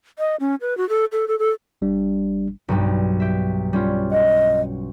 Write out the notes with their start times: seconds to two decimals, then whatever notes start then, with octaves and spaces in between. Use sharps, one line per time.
0.19 D#5
0.40 C#4
0.61 B4
0.77 F#4
0.89 A4
1.12 A4
1.28 A4
1.39 A4
1.82 G#1 G3 D4
2.68 B1 G2 G3
3.20 G4 E5
3.73 G3 C#4 F4
4.12 D#5 F#5